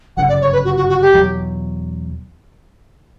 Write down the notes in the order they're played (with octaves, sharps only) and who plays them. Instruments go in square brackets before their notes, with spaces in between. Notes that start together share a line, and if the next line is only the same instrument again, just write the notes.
[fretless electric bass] G1 F#2 C#3 [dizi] F#5
[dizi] D5
C#5
B4
F#4
F#4
F#4
G4
[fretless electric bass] E2 B2 F#3